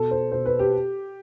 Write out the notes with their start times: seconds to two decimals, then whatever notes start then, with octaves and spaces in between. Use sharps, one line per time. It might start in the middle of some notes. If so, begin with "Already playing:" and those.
Already playing: B2 A4
0.11 C5
0.32 B2 C5
0.46 B4
0.59 G4